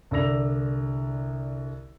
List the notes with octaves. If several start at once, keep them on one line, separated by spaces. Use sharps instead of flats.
C2 D3 D5 E6 A#6 F7